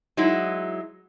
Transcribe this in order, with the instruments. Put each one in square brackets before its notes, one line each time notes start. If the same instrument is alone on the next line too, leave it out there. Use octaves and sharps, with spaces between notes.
[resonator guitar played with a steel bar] F#3 G#3 D#4 E4